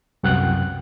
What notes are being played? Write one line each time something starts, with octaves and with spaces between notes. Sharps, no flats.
C2 F#2 F#5 G5 F#6